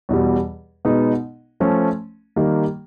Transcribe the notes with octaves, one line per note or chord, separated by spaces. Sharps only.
E2 B2 G3
B2 G#3 B3 D#4
F3 A3 C#4
D#3 G3 A#3